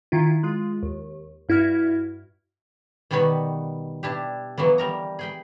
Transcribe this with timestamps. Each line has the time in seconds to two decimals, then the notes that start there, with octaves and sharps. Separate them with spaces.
0.12 D#3 E4 F4
0.43 G#3 F4
0.83 D#2
1.49 G2 E4 F#4 F6 G#6
3.11 B2 D#3 G3 B3 C#5 B5
4.03 D4 E4 G4
4.58 E3 F#3 A#3 B3
4.78 G3 A#4 A#5
5.19 G#4 G5 B5